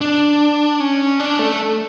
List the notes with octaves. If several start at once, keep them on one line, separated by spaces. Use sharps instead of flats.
D4
C#4
D4
A3